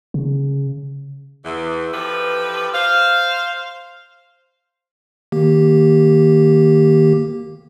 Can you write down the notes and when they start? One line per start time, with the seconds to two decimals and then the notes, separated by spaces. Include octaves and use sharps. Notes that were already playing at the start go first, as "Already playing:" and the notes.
0.14 C#3
1.45 E2
1.93 E3 F3 G4 A4 B4
2.74 C5 F5
5.32 D#3 A#3 G4